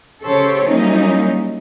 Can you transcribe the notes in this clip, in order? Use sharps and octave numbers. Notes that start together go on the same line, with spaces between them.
C#3 G4 A4 C5 C#5
F#3 G3 A#3 C#4 D#4 E4